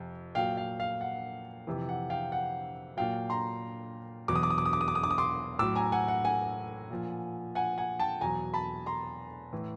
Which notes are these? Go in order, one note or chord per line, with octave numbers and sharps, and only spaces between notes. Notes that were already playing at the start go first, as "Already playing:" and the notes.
Already playing: F2 C3
A#2 F#3 F5 G5
F5
F5
F#5
F2 C3 E3
F#5
F5 G5
F#5
A#2 F#3 F5 G5
A#5 C6
E2 B2 F#3 D6
D#6
D6
D#6
D6
D#6
D6
D#6
D6
D#6
D6
D#6
C6 D6
A2 F#3 D6 E6
G#5 A#5
F#5 G#5
F#5
F#5 G#5
A#2 F3
F#5 G#5
F#5 G#5
G5 A5
E2 B2 F#3 G#5 A#5
A5 B5
A#5 C6
A2 E3